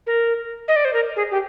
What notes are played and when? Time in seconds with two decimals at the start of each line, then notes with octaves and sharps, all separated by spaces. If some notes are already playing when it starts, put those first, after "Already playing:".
0.07 A#4
0.68 D#5
0.76 D5
0.85 C5
0.93 A#4
1.16 G#4
1.31 G4